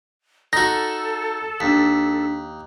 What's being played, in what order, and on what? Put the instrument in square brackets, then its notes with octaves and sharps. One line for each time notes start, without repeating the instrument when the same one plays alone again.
[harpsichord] D#4 F#4 [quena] A4 [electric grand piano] A#6
[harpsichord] D#2 [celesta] D4 B6